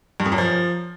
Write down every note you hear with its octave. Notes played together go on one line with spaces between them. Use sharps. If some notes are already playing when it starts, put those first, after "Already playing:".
G2
F2
F#2
F3